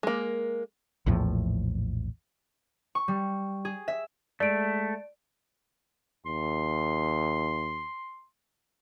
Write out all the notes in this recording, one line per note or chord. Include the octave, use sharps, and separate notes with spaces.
G#3 A#3
A#1 E2 A2 F3
C#6
G3
G#4
E5
G#3 A3 D5 D7
D#2 C6